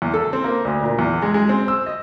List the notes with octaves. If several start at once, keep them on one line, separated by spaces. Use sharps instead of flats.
E2
A4
C4
A#3
D2
A#2
E2
G#3
G#3
C4
E6
D#5